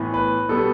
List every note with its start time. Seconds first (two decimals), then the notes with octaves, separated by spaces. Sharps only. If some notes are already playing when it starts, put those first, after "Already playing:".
Already playing: A2 E3 B3
0.14 B4
0.49 B2 G3 B3 A4